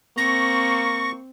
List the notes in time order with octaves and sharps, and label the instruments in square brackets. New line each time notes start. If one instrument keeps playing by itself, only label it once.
[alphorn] A#3 [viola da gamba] C4 [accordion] C#6 [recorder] A#6